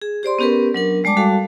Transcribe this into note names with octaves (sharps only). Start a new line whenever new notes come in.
G#4
G4 C5 D5 C6
B3 C#4 G4 A#4 B4
F#3 D4 A#4
G3 G#3 D5 A5 D6
G3 F#4 A4 F5 A5